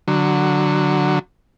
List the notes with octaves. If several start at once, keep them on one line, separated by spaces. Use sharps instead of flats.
D3 F#3